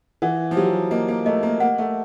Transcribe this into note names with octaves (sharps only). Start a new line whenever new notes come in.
E3 F#5
F3
F#3 G4
A#3 D#5
A#3
A3 D#5
A#3
A#3 F#5
A3